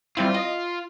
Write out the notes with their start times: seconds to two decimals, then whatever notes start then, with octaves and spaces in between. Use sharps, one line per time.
0.17 G3 C4 E4 F4
0.34 D#5